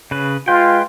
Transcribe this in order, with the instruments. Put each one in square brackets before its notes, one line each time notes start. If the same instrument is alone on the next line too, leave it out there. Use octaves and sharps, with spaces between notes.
[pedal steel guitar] C#3 B4
[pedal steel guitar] G#3 B4 G5 [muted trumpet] F4